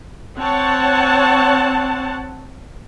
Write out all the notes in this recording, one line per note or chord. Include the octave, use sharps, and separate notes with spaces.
C4 C#5 F#5 A5